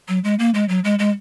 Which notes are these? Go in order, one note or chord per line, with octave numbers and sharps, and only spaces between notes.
F#3
G#3
A#3
G#3
F#3
G#3
G#3